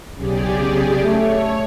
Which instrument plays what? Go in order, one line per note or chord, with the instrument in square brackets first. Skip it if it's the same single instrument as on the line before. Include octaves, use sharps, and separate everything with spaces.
[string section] B1 C#3 [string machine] G4 G#4 D5
[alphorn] A3 [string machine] C#5